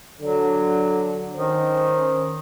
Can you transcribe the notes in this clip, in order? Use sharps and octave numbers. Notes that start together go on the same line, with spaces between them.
D3 F#3
D#3 C#4 C5